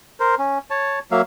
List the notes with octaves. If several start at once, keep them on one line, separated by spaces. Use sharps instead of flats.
A#4 C5
C#4
C#5 A5
F#3 A#3 E5 F5